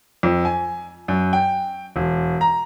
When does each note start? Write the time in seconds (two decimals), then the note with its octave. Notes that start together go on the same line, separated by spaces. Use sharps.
0.23 F2
0.45 G#5
1.08 F#2
1.33 G5
1.96 E1
2.41 A#5